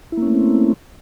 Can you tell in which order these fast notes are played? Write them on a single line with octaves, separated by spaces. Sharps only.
E4 A#3 C#4 A3 C4